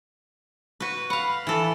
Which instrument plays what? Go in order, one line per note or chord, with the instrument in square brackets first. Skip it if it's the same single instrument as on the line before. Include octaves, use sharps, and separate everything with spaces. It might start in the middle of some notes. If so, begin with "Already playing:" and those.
[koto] F#4 B4
[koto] F5 F#5 [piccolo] B5
[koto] E3 A4